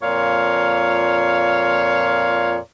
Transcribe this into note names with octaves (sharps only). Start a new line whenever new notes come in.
F2 A#2 C#5 D5 F5